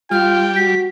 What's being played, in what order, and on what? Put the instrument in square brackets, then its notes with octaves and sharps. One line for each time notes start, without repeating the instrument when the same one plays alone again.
[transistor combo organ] G3 [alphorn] F4 [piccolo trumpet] G5 [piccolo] F6
[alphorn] F#4 [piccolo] B6